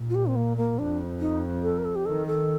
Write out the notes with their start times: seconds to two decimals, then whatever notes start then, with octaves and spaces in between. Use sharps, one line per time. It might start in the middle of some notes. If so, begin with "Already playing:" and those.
Already playing: A#2
0.10 F4
0.15 G4
0.27 C4
0.36 A#3
0.57 A#3
0.78 F2 D4
1.20 D#4
1.63 A4
1.78 A#4
1.85 A4
1.96 G4
2.05 D#3 A4
2.27 A4